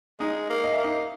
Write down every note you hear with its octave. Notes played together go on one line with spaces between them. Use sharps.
G#3 D#4 D#5
A#3
D#5
A#3 E5
D#4 D#5